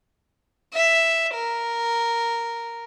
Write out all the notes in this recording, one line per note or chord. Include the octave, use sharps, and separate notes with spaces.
E5
A#4